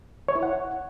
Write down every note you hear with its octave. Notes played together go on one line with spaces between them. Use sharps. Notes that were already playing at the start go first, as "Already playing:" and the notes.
C#5
E4
F#5